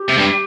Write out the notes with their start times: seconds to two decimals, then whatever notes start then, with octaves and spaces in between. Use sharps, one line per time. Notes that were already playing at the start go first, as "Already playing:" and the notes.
Already playing: G4
0.09 C3
0.18 G2